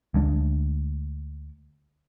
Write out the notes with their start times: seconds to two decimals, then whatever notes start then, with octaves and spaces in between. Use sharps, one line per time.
0.14 D2 G#3 D4